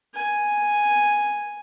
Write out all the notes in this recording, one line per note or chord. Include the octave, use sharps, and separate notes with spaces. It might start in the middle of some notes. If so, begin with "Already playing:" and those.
G#5